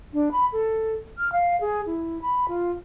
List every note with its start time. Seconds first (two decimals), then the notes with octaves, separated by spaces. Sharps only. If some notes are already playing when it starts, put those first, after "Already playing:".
0.13 D4
0.32 B5
0.53 A4
1.18 F6
1.32 F5
1.61 G#4
1.86 E4
2.22 B5
2.49 F4